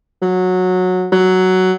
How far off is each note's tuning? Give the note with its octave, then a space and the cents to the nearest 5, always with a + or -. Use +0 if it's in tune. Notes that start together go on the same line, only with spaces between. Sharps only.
F#3 -15
F#3 +5